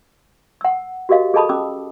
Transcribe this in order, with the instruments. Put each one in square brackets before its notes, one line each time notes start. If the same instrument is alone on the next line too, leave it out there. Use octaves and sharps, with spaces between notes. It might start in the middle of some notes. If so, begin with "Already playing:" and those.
[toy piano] F#5 E6
F#4 G4 A#4 D#5 F5
G#4 A4 D#5 A5 B5 D#6
C#4 D6 E6